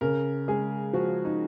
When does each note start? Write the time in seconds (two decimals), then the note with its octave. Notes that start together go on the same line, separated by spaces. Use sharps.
0.01 C#3 A#4
0.48 G#3 G#4
0.93 F3 F#4
1.25 D#4